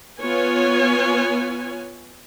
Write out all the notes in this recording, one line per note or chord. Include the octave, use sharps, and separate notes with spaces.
B3 F4 B4 C#5 G#5